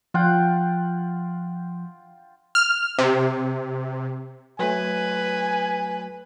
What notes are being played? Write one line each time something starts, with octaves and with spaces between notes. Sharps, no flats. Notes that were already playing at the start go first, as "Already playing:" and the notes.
F3 F4 F#5 G5
F6
C3
F#3 A3 B4 G#5